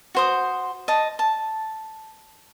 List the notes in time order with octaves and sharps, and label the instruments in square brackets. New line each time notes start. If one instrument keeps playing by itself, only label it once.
[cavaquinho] F#4 C5 D#6
D#5 A5
A5